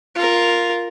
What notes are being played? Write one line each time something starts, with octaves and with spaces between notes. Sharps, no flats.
F4 A#4